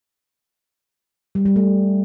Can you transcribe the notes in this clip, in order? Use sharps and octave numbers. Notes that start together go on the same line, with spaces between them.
G3
G3
A3